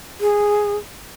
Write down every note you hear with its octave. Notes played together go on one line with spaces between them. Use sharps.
G#4